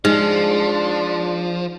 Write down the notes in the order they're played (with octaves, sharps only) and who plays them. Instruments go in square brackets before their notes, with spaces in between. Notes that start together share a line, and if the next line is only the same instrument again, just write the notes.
[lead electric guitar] F3 [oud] G#3 [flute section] D4 D5 C6 [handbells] D#4